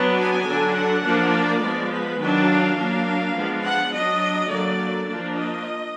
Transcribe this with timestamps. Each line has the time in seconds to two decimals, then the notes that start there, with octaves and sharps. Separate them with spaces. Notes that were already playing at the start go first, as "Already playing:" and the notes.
Already playing: F#3 B3 D4
0.16 G#5
0.46 D3 F#3 D4
0.74 F#5
1.04 F3 A#3 D4
1.32 D5
1.61 F3 G#3 B3
1.90 B4
2.19 D#3 F#3 D4
2.48 F5
2.77 F#3 A#3 D4
3.35 F3 G#3 B3 D4
3.64 F#5
3.93 F#3 D4 D#5
4.50 D3 F#3 A#3 D5
5.08 F3 A#3 D4 D5
5.38 D#5